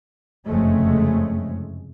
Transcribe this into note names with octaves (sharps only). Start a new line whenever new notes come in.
F#1 F2 C3 G#3 A3 C#4